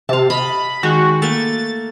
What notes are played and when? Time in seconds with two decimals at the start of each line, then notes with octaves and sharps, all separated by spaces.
0.09 C3 F5 A5
0.30 D#5 B5
0.83 D#3 G#3 F#4
1.22 A3 A#3 A6